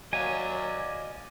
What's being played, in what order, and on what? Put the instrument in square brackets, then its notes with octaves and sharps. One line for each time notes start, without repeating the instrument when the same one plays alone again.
[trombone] F#3 [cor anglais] D5 [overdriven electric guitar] D#5 F5 [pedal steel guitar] G#5